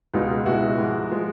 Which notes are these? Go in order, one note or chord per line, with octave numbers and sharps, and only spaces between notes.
C#2 B2 G#3 D#4 F4
C#2 B2 G#3 E4 F#4
G#2 F3 G#3
F3 G#3